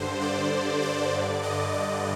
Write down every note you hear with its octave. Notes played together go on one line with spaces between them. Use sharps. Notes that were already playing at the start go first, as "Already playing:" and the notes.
Already playing: G2 D3 C5
D5
D5
G2 D3
D#5
D5